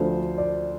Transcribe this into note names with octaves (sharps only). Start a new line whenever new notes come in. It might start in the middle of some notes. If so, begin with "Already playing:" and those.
Already playing: D2 D3 F3 C5
D5